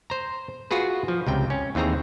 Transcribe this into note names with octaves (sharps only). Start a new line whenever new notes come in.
C5 A#5
F4 F#4 G#4 B4
F3
C#2 C3 G5
C#4
D#2 E3 C4 G#4 A#5